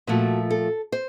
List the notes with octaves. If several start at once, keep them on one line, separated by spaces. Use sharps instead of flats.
A#2 F3 A3 F#4
A4
C5